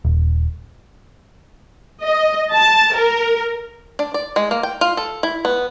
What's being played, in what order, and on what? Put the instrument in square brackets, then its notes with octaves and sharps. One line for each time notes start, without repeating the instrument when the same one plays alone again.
[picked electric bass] D#1
[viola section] D#5
A5
A#4
[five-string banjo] D4
D5
G#3
A#3
G5
F4
A4
E4
B3